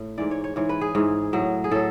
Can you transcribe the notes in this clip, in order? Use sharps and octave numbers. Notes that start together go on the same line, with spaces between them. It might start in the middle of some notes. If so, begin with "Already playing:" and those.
Already playing: A2
G#2 E3 D5
C#5
C#5
G#2 E3 C#5
B4
G#4
G#2 E3
A2 F#3
G#4
A2 F#3 A4